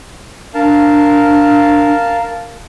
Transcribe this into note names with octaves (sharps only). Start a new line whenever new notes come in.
D4 A#4 F5 A5